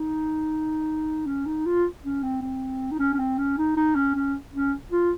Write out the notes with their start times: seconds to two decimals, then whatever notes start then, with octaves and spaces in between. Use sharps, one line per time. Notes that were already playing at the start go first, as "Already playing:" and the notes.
Already playing: D#4
1.26 C#4
1.46 D#4
1.66 F4
2.04 C#4
2.23 C4
2.42 C4
2.92 D#4
2.99 C#4
3.14 C#4
3.19 C4
3.38 C#4
3.58 D#4
3.77 D#4
3.95 C#4
4.15 C#4
4.53 C#4
4.92 F4